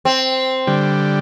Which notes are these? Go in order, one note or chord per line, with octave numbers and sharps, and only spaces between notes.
C4
D3 G3